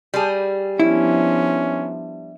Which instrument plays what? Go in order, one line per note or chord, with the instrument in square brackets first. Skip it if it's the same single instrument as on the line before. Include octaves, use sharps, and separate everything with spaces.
[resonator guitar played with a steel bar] G3 G#4
[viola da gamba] F3 B3 D4 [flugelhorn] C#4 [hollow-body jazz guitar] E4